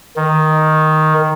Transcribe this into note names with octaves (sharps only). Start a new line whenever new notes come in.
D#3